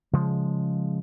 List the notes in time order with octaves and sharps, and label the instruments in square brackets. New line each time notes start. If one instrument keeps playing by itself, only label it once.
[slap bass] C#3 F3 G#3